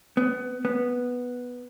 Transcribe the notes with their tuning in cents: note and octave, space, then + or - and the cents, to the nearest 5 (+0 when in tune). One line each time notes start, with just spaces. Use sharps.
B3 +20
B3 -5